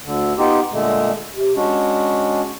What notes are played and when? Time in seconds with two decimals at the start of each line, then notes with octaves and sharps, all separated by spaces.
0.05 D2 D3
0.38 B3 D#4 F4 G4
0.72 A#2 D3 G#3 A3
1.35 C3
1.56 G#3 C#4 D4 F#4